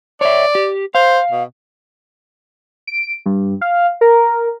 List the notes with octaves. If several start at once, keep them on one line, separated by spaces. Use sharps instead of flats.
C#5 D5 E5
G4
C5 F5
B2
D7
G2
F5
A#4